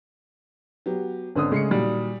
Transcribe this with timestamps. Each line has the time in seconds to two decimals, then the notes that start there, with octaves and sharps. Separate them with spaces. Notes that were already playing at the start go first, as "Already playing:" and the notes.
0.86 F#3 B3 G4
1.36 G#1 D3 C#4 B4 D#6
1.52 C#3 G#3 A3 C7 C#7
1.71 A#2 D#3 F#3 G3